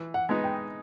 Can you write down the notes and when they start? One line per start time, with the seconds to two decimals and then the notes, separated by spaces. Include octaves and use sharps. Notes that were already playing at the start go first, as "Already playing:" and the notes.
Already playing: E3
0.14 F#5
0.29 G#3 B3 D#4
0.44 G5